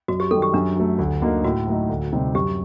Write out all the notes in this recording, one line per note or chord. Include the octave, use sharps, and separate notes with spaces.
F#2 F#4
G4
D#3 G3 A4
G4
F#2 D4
F#3 A3
D2
D3 F#3 A#3 D#4
A2 F#4
F#3 A3 D#4
D2
C3 G3 C4 D#4
F#2 G4